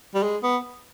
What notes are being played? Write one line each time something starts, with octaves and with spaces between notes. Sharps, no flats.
G3
G#3
B3